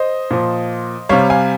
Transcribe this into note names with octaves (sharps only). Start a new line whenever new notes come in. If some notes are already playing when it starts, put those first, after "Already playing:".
Already playing: C5 D#5
A#2 F3
C3 G3 C#5 F5
F5 G#5